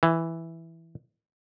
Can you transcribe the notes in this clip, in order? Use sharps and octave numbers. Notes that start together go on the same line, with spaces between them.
E3